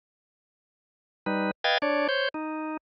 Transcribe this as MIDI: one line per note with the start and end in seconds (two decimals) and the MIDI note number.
1.26 1.51 55
1.26 1.51 63
1.26 1.51 71
1.64 1.78 71
1.64 1.78 75
1.64 1.78 77
1.64 1.78 79
1.64 1.78 92
1.64 1.78 93
1.82 2.08 62
1.82 2.08 73
1.82 2.08 74
2.09 2.28 72
2.09 2.28 73
2.09 2.28 91
2.34 2.77 63